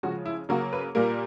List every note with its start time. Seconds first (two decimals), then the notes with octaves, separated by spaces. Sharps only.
0.03 C#3 F3 G#3 F#4
0.26 E4
0.49 C#3 F#3 A#3 F#4
0.73 B4
0.95 A#2 G3 A#3 A#4